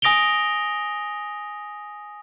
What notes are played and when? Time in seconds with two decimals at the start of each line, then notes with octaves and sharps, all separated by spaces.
0.02 G#5 D#6 A#6 D7 F7 G7